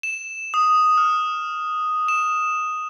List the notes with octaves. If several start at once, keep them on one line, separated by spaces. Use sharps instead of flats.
E7
D#6
F6
E7